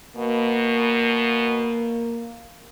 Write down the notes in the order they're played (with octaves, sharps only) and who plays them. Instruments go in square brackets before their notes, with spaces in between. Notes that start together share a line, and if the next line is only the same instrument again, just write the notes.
[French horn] B2 [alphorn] A#3